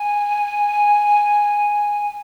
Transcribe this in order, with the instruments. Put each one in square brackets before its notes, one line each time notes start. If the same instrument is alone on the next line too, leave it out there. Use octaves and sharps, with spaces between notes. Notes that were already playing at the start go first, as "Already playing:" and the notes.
Already playing: [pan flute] G#5